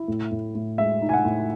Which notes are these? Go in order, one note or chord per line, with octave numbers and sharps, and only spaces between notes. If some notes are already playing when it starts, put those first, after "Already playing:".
Already playing: E4
A2
A2
A2
G#3 E5
D#4
G#5
F#5
A2